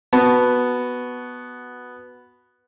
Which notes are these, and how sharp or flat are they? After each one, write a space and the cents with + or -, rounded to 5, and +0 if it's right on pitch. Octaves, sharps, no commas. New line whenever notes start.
B3 +0 F#4 +0 A5 -10